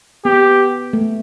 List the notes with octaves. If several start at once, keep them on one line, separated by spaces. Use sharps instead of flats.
B3 G4
A3